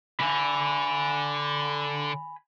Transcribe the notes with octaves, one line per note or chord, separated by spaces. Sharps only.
D3 G#5 B5